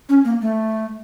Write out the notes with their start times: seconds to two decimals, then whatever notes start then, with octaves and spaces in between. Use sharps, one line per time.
0.09 C#4
0.25 A#3
0.42 A3